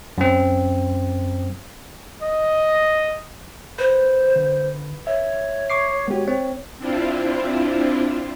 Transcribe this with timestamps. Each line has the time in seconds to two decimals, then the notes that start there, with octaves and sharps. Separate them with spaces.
0.18 F#2 C4
2.22 D#5
3.79 B4 C5
4.36 D3
5.07 C#5 E5
5.70 C#6 D6 C7
6.07 G#3 B3 F#4 G4
6.28 C4 C#5
6.78 C4 D4 E4 F4